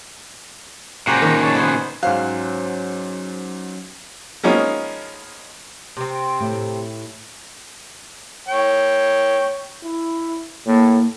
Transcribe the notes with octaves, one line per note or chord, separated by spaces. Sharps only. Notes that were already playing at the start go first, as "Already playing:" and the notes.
A#2 C#3 F#4 G4 C5 A#5
D#3 D#4
C#5 A5
B3 C5 G#5
G#2 F#3 C#4 C5 F5 F#6
F3 G#3 A#3 B3 C#4 D#4
C3 C4
A2 A3 G4
C#5 G5
E4
A2 A#3